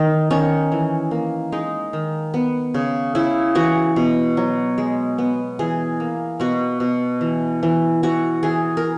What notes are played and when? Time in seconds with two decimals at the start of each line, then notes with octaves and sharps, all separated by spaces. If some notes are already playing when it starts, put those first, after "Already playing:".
Already playing: D#3 D#4
0.31 D#3 C#4
0.72 E3
1.11 A#3
1.52 G#3 D#4
1.93 D#3
2.34 B3
2.74 C#3
3.15 C#3 E4
3.55 E3 F#4
3.96 B2
4.37 F#3
4.78 G#3
5.18 B3
5.59 E3 G#4
6.00 A#3
6.40 B2 F#4
6.80 B2
7.21 E3
7.63 E3
8.03 E3 F#4
8.43 E3 G#4
8.77 A#4